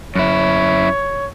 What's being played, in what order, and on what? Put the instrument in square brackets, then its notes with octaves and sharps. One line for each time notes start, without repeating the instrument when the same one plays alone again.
[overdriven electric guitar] F#2 E4 [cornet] C#5